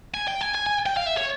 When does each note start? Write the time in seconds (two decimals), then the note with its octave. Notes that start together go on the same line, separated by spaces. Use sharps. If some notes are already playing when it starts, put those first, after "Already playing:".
0.14 G#5
0.28 G5
0.41 G#5
0.55 G#5
0.66 G#5
0.86 G5
0.97 F5
1.06 E5
1.17 C#5